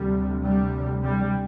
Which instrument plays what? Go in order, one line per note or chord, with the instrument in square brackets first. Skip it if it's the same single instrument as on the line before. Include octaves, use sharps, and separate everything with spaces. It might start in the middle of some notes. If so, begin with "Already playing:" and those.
Already playing: [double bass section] D2 C3 G3
G3
G3